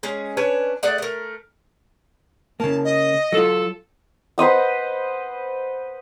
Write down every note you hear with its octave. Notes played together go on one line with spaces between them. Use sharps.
G#3 C#4 G#4
C#4 D4 B4 C#5
A3 G#4 D5 F#5
A3 A#4
C#3 A#3 A5
D#5
F#3 F4 A4
B4 C5 D#5 F#5